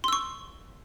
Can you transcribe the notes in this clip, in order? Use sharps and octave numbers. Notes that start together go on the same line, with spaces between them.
C6 C#6 E6